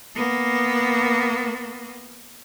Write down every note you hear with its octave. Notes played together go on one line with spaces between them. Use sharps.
A#3 B3